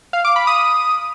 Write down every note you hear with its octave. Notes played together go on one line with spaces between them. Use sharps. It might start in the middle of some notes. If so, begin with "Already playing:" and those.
F5
D6
B5
D#6